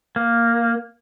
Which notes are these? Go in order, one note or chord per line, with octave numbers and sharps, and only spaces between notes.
A#3